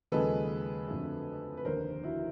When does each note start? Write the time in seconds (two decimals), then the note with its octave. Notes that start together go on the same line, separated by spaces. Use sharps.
0.12 D#2 C#3 F3 G#3 A4 B4
0.88 F2 D3 F#3 A3
1.57 B4
1.65 F1 D#2 D3 A#4 C5
2.03 E4 F#4